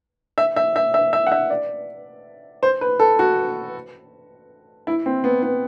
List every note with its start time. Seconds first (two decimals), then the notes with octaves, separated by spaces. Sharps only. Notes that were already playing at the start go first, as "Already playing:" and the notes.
0.38 E5
0.56 E5
0.76 E5
0.94 E5
1.13 E5
1.27 F#5
1.32 E5
1.50 D5
2.63 C5
2.81 B4
3.00 A4
3.19 F#4
4.87 E4
5.06 C4
5.24 B3
5.43 B3